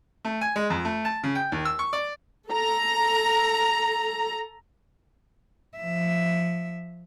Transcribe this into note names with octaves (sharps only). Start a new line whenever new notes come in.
A3
G#5
G#3
F2
A3
A5
C#3
G5
D#2
E6
C#6
D5
A4 A#5
F3 E5